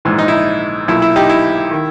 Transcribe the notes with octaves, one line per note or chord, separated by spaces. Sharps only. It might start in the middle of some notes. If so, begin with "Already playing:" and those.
A#1 G#2 E3
D#4
E4
D#4
B1 A#2 E4
E4
D#4 G4
E4
D#3